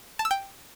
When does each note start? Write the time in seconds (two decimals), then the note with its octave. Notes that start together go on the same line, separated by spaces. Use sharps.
0.19 A5
0.25 E6
0.31 G5